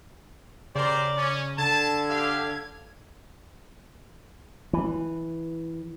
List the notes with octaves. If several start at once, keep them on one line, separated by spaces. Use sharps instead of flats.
C#3 G4 A#4 C5 D5
C#4
D3 A5 G#6
G4 F5
E3